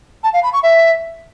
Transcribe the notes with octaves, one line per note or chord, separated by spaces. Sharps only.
A5
F5
B5
C#6
E5